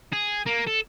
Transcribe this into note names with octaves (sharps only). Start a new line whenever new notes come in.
G#4
A#3
A4